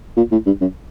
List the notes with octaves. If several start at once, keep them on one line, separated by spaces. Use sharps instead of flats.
A#2
A2
G2
F#2